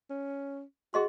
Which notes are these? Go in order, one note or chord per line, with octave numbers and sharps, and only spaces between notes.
C#4
F#4 G#4 D#5 C6